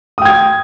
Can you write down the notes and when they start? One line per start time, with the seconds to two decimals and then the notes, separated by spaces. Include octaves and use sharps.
0.18 D#6
0.22 G5
0.25 G#6